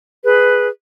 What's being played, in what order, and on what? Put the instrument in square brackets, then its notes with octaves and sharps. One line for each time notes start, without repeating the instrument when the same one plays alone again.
[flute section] G#4 B4